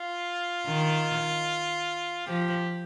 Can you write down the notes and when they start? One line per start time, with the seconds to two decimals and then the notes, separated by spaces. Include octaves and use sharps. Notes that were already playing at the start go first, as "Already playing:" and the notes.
Already playing: F4
0.67 D#3
2.27 F3 G4